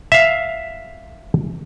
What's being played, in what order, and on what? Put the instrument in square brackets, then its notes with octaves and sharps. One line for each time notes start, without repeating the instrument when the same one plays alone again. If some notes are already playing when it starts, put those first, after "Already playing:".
[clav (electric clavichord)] E5 F5